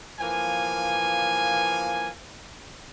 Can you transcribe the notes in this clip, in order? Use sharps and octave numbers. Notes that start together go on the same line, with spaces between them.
E3 F3 A#3 G#5